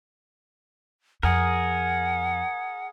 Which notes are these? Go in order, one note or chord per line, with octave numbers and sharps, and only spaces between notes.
F2 G#4 A#4 F#5